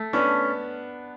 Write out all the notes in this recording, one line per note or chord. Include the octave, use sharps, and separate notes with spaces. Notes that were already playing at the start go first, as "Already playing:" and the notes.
Already playing: A3
B3 C#4 D4